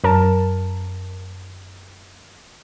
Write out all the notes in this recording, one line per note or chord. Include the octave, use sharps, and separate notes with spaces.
F#2 A#4 A5